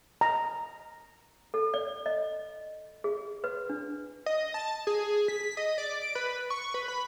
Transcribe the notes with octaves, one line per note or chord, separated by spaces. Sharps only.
A#5
A4
D5
D#5
G#4
B4
D4
D#5
A5
G#4
B6
D#5
D5
D7
B4
C#6
B4
B5